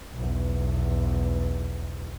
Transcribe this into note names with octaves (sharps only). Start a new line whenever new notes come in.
B1 E2